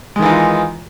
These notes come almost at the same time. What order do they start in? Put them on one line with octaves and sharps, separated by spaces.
G#3 D#3 E3 D#4 F4